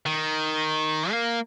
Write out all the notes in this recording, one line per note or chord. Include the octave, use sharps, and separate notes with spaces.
D#3
A#3